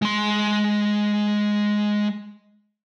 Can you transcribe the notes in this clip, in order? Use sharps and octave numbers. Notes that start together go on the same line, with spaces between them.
G#3 C6